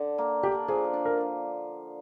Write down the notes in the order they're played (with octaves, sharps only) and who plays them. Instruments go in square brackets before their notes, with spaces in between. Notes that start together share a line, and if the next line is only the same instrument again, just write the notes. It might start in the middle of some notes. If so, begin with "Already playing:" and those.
Already playing: [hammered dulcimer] D3
A#3
[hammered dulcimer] D4 [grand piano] G4
[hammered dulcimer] F3 [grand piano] G#4
[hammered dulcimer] D4
[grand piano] A#4